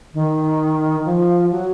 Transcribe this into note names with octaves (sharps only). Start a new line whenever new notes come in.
D#3
F3
F#3